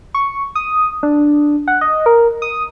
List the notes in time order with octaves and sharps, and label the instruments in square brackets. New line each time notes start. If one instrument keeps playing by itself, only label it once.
[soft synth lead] C#6
D#6
D4
F#5
D#5
A#4
D#6